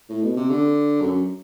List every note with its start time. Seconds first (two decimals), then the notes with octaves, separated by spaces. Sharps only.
0.10 A2
0.23 B2
0.37 C3
0.50 D3
1.01 F#2